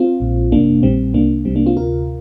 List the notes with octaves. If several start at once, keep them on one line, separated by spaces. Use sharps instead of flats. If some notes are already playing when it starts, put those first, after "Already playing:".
Already playing: C4 F4
A#1 A#2
G1 F2 C3 A#3 D4
A#1 A#2 G3 C4
C2 C3 A#3 D4
C2 C3 G3 C4
A#3 D4
C4 F4
D2 C3 F4 A#4